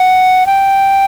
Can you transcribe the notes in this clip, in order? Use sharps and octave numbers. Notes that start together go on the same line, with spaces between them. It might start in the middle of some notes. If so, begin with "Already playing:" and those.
Already playing: F#5
G5